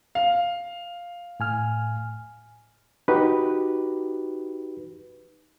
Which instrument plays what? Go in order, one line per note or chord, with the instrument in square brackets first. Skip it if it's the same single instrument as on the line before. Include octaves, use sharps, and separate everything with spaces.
[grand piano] F5
[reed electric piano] A2 G#5 F6
D#4 F#4 G4 B4